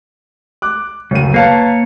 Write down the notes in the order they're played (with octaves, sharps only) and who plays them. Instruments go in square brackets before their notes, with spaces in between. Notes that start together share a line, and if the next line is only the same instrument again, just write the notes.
[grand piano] D6 F#6
[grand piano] D1 F#2 D#7 [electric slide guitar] C#3
[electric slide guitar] A#3 C#5 [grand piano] B4 F5 A5